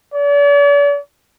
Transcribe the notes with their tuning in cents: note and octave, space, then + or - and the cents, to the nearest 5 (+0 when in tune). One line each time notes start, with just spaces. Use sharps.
D5 -45